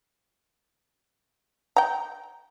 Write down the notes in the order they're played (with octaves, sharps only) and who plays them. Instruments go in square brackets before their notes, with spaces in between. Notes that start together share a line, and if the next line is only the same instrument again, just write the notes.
[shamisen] G5 A#5